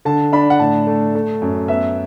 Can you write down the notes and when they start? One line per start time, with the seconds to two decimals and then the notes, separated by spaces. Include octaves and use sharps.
0.05 D3 A5
0.33 D4 B5
0.50 F#5
0.60 A2 A5
0.87 A3
1.15 A3
1.41 F#2
1.68 B3 E5